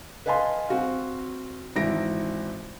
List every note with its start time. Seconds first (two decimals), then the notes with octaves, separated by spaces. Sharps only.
0.26 B4 D#5 F5 G#5 A5 C6
0.69 C4 F#4 F5
1.76 G#1 E3 E5 A#6 D7